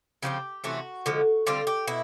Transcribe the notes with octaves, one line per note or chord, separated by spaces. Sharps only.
C#3 F3 A3 C4 G4
C3 E3 A3 C#4 F#4
D3 F3 G#3
D3 G3 C4 F4
G4
B2 E4